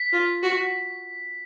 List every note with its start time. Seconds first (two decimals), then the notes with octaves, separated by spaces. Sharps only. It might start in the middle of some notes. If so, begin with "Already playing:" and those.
Already playing: B6
0.13 F4
0.43 F#4